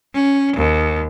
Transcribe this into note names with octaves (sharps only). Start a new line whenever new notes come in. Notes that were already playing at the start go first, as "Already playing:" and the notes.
C#4
D#2